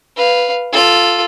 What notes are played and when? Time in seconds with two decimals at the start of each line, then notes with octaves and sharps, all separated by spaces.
0.16 B4 F5
0.73 F4 A4